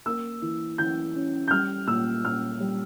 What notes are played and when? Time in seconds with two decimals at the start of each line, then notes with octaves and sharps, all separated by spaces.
0.06 A#3 E6
0.42 E3
0.78 E3 G6
1.15 C#4
1.48 G6
1.51 G3 F6
1.87 A#2 E6
2.24 A#2 F6
2.60 G3